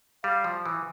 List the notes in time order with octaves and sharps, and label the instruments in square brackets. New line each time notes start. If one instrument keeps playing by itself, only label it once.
[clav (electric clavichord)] G3 [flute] F5
[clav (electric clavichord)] F3
E3